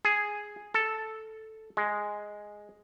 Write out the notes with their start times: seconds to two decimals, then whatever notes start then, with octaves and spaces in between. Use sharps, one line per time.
0.05 G#4
0.74 A4
1.77 G#3